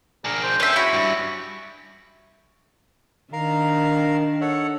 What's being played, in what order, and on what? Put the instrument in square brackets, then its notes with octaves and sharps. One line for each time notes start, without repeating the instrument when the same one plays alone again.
[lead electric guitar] D4 G#4 [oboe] A#4
[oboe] C5
[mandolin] C4 E5 [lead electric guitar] C#4
[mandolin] E4 B5 [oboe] F#4
[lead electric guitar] G2
[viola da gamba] D#3 D4 [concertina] A#4 F5 A#5
[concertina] A4 C#5 F#5